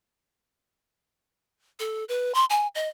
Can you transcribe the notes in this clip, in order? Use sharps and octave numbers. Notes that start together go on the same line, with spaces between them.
A4
B4
C6
G#5
D#5